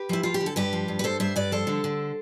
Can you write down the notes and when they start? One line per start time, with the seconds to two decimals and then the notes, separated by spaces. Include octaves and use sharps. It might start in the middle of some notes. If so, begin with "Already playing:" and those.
Already playing: G4 B4
0.09 F3 E4
0.23 F3 F4
0.34 G4
0.41 D3
0.46 A4
0.56 G2 G4 B4
0.73 F3
0.88 G2
0.99 B4
1.04 G2 A4 C5
1.20 G2 C5 E5
1.36 G2 B4 D5
1.51 F3 A4 C5
1.67 D3
1.84 D3